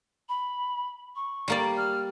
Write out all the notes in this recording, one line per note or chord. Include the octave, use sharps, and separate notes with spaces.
B5
C#6
G3 A#3 D5
F6